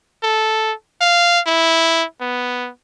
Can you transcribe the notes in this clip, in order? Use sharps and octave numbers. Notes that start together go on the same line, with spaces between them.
A4
F5
E4
B3